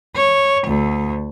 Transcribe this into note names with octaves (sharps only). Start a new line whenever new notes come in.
C#5
D2